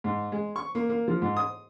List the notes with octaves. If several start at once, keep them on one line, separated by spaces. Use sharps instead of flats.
G#2
G#3
C#6
A#3
A#3
F3
G#2
D#6